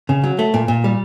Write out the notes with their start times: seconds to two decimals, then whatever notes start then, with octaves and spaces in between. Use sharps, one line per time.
0.09 C#3
0.24 F#3
0.39 A3
0.54 A#2
0.68 A#2
0.84 G3